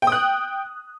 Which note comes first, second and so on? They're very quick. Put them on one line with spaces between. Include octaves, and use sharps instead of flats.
G5 D#6 F#6